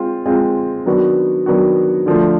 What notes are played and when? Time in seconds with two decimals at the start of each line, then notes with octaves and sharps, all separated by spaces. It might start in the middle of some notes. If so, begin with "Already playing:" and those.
Already playing: G#3 C4 F4
0.26 G#3 C4 F4
0.86 D#3 F#3 B3 D4 F#4
1.46 D#3 F#3 B3 D4 F#4
2.06 D3 F3 A3